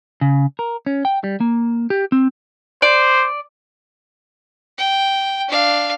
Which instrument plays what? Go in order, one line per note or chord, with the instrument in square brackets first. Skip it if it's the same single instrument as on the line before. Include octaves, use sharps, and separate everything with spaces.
[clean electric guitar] C#3
A#4
C#4
G5
G3
A#3
G4
C4
[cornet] C5 [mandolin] D5
[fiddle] G5
D4 F5